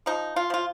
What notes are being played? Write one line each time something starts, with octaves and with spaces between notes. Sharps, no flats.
F3 D#4
F4
F3 F4